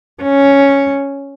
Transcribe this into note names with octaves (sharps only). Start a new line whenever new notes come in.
C#4